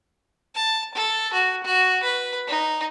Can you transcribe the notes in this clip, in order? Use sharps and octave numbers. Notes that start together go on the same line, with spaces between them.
A5
A4
F#4
F#4
B4
D#4